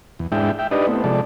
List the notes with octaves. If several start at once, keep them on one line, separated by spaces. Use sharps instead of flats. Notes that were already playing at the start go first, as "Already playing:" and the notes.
E2
G#2 G#3 D4 E4 E5 G5
E5 G5
D4 D#4 G4 B4 D5 D#5
A3 B3 C4 E4
C3 F3 G#3 A4 D5